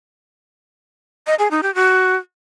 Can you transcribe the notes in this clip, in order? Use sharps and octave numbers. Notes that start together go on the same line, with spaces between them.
D#5
G#4
D#4
G4
F#4